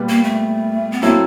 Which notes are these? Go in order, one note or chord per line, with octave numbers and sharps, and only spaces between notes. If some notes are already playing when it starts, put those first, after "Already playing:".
Already playing: A#2 G3 B3
A#3
A3
B3
F#3 A3 A#3 C4 E4 A4